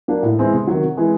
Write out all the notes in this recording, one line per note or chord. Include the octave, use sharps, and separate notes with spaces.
F#3 A#3 D4
A2
E3 G#3 C4 E4
C3
D#3 F#3
C3
E3 G#3